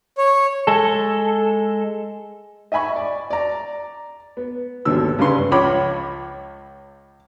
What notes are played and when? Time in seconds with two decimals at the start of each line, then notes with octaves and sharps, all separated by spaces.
0.18 C#5
0.67 G#3 A4
2.72 D#5 E5 G#5 B5 C#6
2.96 D5
3.30 D5 A#5
4.37 B3
4.85 G#1 D#2 B2 D3 E6
5.19 G2 C#3 C#4 D4 B4 C6
5.51 C#2 F3 C#5 B5 D6